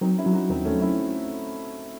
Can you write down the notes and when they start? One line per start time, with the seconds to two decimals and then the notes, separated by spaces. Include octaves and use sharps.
0.01 F#3 C4 D#4
0.18 C#4 E4
0.26 F#3
0.33 D#4 F#4
0.50 D#2 C4 D#4
0.65 A3 C#4
0.73 F#3
0.81 C#4 E4